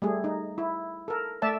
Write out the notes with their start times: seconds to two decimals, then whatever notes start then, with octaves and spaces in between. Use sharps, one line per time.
0.02 G3 A3 G#4
0.24 D#4
0.58 E4
1.08 A4 A#4
1.42 A3 D5 E5 A5